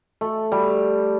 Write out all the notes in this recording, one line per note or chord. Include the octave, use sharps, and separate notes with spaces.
A3
G3